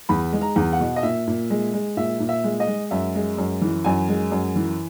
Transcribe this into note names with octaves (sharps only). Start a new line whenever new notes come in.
E2 B5
G#3
A#5
E2
F#5
B2
D#5
A#2 E5
A#2
G#3
G#3
A#2 E5
A#2
E5
G#3
D#5
G#3
F#2 E5
G#3
F#2
E3
F#2 G#5
G#3
F#2
E3